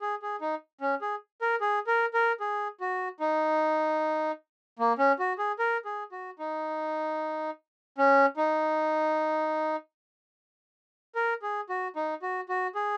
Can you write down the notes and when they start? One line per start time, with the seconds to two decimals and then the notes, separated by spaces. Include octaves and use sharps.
0.01 G#4
0.22 G#4
0.41 D#4
0.81 C#4
1.01 G#4
1.42 A#4
1.61 G#4
1.87 A#4
2.14 A#4
2.40 G#4
2.80 F#4
3.20 D#4
4.79 A#3
4.98 C#4
5.19 F#4
5.38 G#4
5.59 A#4
5.85 G#4
6.12 F#4
6.39 D#4
7.98 C#4
8.37 D#4
11.15 A#4
11.42 G#4
11.69 F#4
11.96 D#4
12.22 F#4
12.49 F#4
12.75 G#4